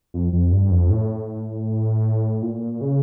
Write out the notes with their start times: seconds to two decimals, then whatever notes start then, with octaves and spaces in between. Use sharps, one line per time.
0.14 F2
0.33 F2
0.52 G2
0.71 F2
0.90 A2
2.42 A#2
2.81 C#3